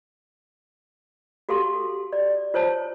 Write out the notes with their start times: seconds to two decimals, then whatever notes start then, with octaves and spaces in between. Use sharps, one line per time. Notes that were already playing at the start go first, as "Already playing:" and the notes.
1.49 F#4 G4 A4 F5 C6
2.13 D5
2.54 F4 C5 C#5 A5